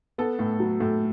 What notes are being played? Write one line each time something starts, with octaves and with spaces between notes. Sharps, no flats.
B3 A4
A2
F#3
A2